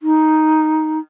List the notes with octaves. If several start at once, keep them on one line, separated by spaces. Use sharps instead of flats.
D#4